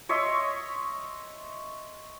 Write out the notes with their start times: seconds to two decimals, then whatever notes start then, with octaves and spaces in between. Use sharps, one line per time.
0.09 C#5 D#5 E5 C6